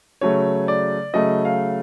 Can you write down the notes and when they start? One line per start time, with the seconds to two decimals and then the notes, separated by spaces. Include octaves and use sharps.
0.21 C#3 F#3 A3 C#5
0.68 D5
1.14 C#3 F#3 A3 D#5
1.45 F5